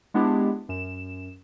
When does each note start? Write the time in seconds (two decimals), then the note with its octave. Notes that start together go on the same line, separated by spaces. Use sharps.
0.14 G#3 B3 D4 E4 G4
0.69 F#2 E7